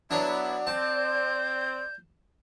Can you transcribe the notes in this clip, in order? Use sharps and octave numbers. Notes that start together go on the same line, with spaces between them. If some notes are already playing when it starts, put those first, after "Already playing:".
F#3 B3 D4 E4 D5 A5
C4 A5 G6